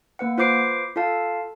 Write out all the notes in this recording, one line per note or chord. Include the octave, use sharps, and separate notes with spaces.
A#3 B4 F#5
F4 B4 C5 D6 C7 D7
F4 A4 F5 A5